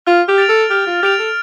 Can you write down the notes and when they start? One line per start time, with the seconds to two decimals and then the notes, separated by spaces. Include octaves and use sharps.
0.07 F4 F6
0.28 G4
0.38 A6 D7 F7
0.49 A4
0.70 G4 F6
0.87 F4
1.03 G4 A6 D7 F7
1.19 A4